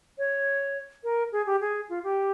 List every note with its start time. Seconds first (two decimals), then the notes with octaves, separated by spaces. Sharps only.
0.18 C#5
1.04 A#4
1.32 G#4
1.46 G4
1.61 G#4
1.89 F4
2.03 G4